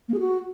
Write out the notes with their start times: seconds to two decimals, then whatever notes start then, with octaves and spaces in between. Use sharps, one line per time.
0.08 A#3
0.14 G#4
0.20 F#4